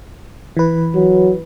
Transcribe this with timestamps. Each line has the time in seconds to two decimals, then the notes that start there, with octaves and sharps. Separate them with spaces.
0.57 E3 B4
0.95 F#3